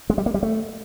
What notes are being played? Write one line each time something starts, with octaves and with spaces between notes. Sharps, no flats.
G#3
G3
A#3
G3
A3